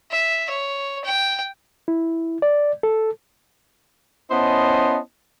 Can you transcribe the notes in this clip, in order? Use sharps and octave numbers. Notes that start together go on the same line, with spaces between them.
E5
C#5
G5
E4
D5
A4
B3 C#4 E4 C5 D#5 A5